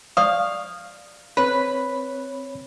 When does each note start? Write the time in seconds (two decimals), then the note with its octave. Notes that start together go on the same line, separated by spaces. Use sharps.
0.17 D5 F5 C#6 D#6
1.37 C4 B4 C#5 B5